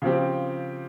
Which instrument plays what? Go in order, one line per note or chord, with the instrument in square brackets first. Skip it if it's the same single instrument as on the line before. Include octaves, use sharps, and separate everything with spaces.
[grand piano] C#3 F3 C4 G4